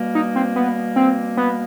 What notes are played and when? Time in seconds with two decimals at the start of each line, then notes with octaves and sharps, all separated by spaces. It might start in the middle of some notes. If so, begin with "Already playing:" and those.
Already playing: B2 G3 A#3
0.15 D#4
0.36 C4
0.56 B3
0.96 C4
1.37 B3